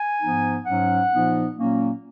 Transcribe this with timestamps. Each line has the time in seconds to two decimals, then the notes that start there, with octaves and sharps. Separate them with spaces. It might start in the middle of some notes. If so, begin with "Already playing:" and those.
Already playing: G#5
0.21 G#2 F3 B3 D#4
0.65 G#2 F#3 C#4 F#5
1.11 A#2 F3 B3 D#4
1.55 A#2 F#3 A#3 C#4